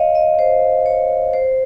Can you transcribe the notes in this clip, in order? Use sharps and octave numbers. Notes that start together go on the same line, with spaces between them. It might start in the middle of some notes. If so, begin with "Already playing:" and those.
Already playing: C#5 D#5 F5
D#5
C5
C#5
C5